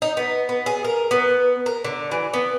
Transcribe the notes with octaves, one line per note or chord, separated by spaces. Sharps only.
D#4
B3
B3
G#4
A#4
B3
A#4
D3
E3
B3